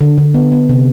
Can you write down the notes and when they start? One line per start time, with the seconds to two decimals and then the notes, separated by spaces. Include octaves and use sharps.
0.01 D3
0.17 D3
0.34 B3
0.52 B3
0.69 C3